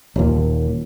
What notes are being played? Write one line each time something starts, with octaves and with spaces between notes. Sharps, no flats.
D#1 D#2 A#2